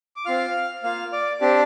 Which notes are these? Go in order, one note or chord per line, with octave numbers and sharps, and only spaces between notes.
D6
C4 F4 F5 F6
A#3 F4 F5 F6
D5 D6
C4 D4 G4 D5